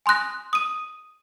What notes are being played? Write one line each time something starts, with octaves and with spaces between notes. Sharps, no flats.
G#5 C6 D#6 F#6 A#6
D#6 D#7